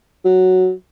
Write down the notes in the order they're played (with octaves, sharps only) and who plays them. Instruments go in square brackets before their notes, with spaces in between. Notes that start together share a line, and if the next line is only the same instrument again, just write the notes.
[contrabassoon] F#3